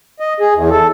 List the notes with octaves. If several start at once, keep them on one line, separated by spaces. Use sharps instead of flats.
D#5
G#4
E2
A4